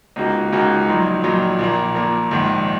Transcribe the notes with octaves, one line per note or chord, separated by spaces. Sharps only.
C#2 C#3 A#3 D#4 F#4
C#2 C#3 A#3 D#4 F#4
A#1 A#2 F#3 D#4
A#1 A#2 F#3 D#4
A#1 A#2 A#3
A#1 A#2 A#3
A#1 G#2 D#3